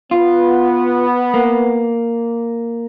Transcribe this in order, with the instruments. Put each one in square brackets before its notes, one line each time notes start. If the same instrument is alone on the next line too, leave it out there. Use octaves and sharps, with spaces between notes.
[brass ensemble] B3 [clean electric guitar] F4
[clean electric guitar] A#3